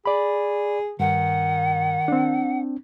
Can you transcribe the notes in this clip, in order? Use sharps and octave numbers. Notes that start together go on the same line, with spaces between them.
G#4 D5 B5
G2 D#3 F#5
C4 D4